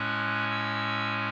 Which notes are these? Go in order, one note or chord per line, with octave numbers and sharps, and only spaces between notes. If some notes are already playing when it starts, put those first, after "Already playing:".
Already playing: A2 G#3 C#4 F#6
E6